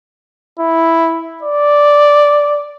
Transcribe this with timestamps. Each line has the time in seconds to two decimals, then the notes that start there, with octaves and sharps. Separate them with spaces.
0.59 E4
1.43 D5